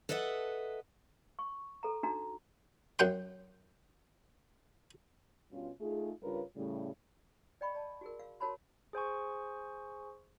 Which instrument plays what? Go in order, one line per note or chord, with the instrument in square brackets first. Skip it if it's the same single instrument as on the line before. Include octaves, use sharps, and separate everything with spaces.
[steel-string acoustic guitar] A4 B4 D#5 E5 F#5
[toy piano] C#6
A4 A#5
D4 D#4 F#4 A#5
[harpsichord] F#2 F#5 G5 C6
[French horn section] G2 B2 C#4 F4
A3 D#4 F4 G#4
G2 C#3 F4 A#4 B4 C#5
A2 C#3 G3
[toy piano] D5 D#5 G5 B5 C#6
D5 A5
F#4 G#4 A#4
F5
F#4 A#4 C#5 A5 B5 C6
[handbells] G#4 C5 G#5 C#6